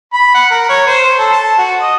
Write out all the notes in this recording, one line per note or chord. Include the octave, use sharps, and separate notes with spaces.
B5
F#5
A#4
C#5
C5
A4
A5
F#4
D#5